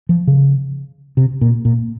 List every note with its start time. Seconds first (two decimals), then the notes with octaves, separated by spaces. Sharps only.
0.09 F3
0.27 C#3
1.17 C3
1.41 A#2
1.65 A#2